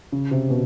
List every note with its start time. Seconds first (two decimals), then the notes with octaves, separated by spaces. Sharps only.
0.12 C#3
0.31 C3
0.50 B2